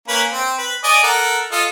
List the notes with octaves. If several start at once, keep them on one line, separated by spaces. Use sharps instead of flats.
A#3 C#4 B4
C4
B4
D5 D#5 G#5
A4 A#4 F#5
F4 A4 D#5